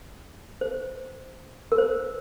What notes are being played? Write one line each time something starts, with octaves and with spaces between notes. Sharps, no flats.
C5
A#4
C5